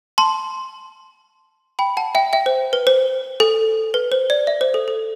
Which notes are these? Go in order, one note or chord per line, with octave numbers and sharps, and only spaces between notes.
A5 C6
G5 B5
F#5 A5
E5 G5
E5 G5
C5
B4
C5
A4
B4
C5
D5
E5
C5
A4
A4